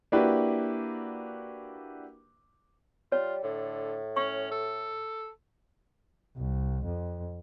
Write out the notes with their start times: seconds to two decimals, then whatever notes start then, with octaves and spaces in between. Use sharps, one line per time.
0.12 A#3 D4 E4 F#4 G4 B4
3.12 G3 F4 C#5
3.43 A2 D3
4.16 C#4 C#6
4.52 A4
6.37 C2
6.85 F2